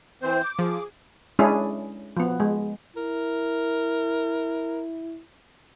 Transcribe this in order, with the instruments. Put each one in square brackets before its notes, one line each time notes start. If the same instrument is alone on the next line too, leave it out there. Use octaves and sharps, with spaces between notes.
[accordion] E3 C4 C5 [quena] G6
[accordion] D6
[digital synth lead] F3 [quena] G#4
[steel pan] G#3 C#4 D4 E4 G#4
F3 B3
G#3
[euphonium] E4 [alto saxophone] A#4